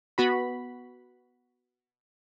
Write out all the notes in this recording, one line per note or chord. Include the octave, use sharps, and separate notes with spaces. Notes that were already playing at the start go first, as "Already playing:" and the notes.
B3 F#4 B5